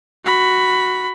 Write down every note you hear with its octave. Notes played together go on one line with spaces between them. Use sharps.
F#4 B5